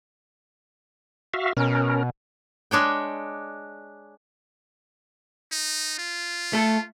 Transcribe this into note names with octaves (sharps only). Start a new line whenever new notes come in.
F#4 E5 F5
B2 C#4 A#4
G#3 D4 C#5 G5
D#4
F4
A3 A4